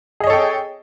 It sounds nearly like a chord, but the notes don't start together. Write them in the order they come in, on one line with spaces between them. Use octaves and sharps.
G#4 D#5 C#5 A4 G5